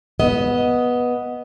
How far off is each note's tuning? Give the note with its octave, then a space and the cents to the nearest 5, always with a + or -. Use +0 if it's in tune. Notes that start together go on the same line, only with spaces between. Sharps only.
B3 -10 D#5 +5